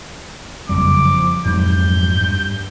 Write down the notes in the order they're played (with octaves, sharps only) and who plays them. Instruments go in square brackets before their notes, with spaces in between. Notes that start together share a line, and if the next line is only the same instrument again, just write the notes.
[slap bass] F#1 F2 G3 [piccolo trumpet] D6
[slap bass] F3
[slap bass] F2 G#2 F#3 [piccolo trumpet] G6
[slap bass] G2